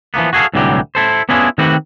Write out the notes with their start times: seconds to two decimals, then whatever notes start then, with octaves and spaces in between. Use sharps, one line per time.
0.14 E3 F3 A#3 B3
0.33 F#4 G#4 A4 F5
0.54 C2 A2 D3 E3 F#3 G4
0.95 E4 A4 C5
1.29 B3 C#4 D4 E4 F4 G#4
1.58 D#3 A3 C4 F#4 G4 B4